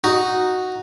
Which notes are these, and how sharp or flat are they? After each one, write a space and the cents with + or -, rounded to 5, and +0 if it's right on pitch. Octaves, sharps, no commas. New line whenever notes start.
D#4 +0 F#4 +0